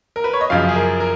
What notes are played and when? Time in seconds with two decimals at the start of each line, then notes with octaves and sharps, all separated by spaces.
0.16 A#4
0.24 B4
0.33 C#5
0.41 D#5
0.50 F#2 C#3 F3 F5
0.68 G#4
0.75 A#4
1.00 A#4